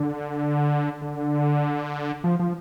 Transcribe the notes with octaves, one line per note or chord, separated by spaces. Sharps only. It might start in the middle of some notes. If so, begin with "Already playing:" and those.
Already playing: D3
D3
F3
F3